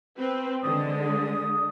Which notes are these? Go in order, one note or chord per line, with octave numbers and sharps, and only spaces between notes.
C4 B4
D3 G#3 D#6